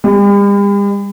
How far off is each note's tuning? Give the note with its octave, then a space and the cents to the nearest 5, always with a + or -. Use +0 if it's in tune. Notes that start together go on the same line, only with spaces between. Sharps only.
G3 +45